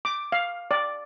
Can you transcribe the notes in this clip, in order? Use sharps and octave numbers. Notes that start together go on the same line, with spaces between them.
D6
F5
D5